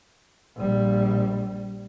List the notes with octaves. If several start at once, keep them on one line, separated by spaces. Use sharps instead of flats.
A#1 G3